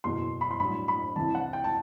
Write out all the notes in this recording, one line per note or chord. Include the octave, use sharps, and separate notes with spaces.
F#1 E2 B2 C6
B5
C6
A1 G2 F#3 B5
B5
C2 C3 E3 A5
F#5
G5
A5